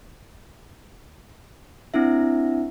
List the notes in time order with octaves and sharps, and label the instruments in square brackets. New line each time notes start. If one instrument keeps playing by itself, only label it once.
[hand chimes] C4 D4 E4 E5